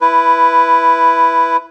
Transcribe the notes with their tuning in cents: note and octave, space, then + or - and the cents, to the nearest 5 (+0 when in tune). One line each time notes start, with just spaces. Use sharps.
E4 +10 B4 +0